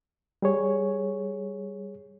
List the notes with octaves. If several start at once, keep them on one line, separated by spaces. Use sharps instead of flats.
G3 G#4 C#5